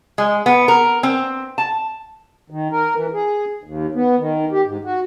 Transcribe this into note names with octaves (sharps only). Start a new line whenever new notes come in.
G#3
B3
A#4
C4
A5
D#3
A#4
E3
G#4
D#2
B3
D#3
G4
G#2
F#4